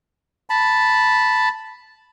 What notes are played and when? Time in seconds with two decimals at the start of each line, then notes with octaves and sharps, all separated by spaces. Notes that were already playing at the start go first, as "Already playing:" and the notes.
0.50 A5 B5